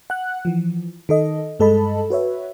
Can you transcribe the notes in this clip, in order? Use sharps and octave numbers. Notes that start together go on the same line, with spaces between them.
F#5 F#6
E3 F3
D#3 A4 D#5
G2 G#3 A4 D#5 A5 B5
F#4 B4 C#5 E5